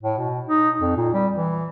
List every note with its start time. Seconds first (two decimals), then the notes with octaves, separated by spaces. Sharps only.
0.03 A2
0.18 B2
0.48 D#4
0.80 F2
0.96 A#2
1.14 G3
1.36 E3